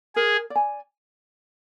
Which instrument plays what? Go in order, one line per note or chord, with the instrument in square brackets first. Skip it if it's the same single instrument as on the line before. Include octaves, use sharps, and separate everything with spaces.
[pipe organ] G#4 [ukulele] A#4
[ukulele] D5
G#5